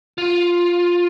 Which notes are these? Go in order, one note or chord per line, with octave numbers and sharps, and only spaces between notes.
F4